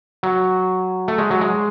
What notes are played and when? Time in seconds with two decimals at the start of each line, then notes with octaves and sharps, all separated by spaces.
0.23 F#3
1.08 A3
1.18 G#3
1.30 F#3
1.41 G#3